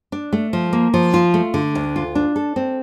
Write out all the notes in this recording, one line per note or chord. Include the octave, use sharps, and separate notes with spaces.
D4
A3
F3
A#3
F3
F4
A3
D3
D2
F4
D4
A4
C4